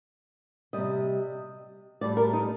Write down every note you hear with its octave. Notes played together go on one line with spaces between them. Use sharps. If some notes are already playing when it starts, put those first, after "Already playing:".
C3 G3 D#5
A2 G3 D5
A#4
D#4